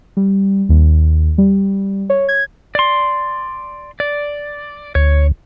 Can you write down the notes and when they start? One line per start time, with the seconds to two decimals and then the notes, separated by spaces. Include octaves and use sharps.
0.17 G3
0.69 D#2
1.38 G3
2.10 C#5
2.28 G#6
2.75 D5 C6
4.00 D5
4.95 D2 C#5